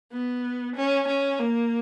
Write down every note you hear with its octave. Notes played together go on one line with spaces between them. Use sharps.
B3
C#4
C#4
A#3